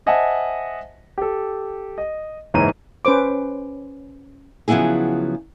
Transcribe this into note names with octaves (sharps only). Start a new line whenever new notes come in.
C5 D#5 E5 F#5 G#5 A5
G4 A4
D#5
F#1 G#2 E3 C#5 A#5 D#7
C#4 B4 C5 D6
C#3 F3 F#3 B3 E4 G#4